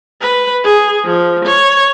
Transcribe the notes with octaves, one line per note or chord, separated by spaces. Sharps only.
B4
G#4
F3
C#5